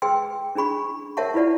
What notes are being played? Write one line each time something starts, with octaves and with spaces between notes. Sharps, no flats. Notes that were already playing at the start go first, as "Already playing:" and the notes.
G#4 B4 G5 C6 E6
C#4 D4 G#4 B5 C#6
A#4 C#5 E5 F#5 A5 C#6
E4 F4 B4 D5 F#5